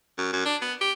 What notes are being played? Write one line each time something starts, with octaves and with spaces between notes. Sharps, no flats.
F#2
F#2
D4
B3
G4